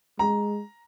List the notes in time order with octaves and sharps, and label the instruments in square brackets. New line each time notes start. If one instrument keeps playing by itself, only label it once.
[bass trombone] G#3 [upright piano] A#5